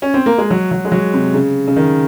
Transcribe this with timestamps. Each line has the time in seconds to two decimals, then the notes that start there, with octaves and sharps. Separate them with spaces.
0.02 C#4
0.14 C4
0.26 A#3
0.38 G#3
0.50 F#3
0.71 F#3
0.85 G#3
0.92 F#3
1.14 C3
1.34 C#3
1.68 C#3
1.76 D#3